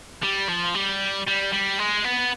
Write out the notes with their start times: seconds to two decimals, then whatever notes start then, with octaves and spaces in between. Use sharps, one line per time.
0.23 G3
0.49 F3
0.75 G3
1.27 G3
1.52 G3
1.79 G#3
2.04 B3